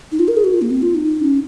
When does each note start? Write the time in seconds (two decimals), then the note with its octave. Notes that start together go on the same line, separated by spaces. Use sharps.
0.12 D#4
0.19 F4
0.28 A#4
0.37 G#4
0.44 F#4
0.54 F4
0.62 A#3
0.70 C4
0.82 F4
0.95 D#4
1.05 D#4
1.23 C#4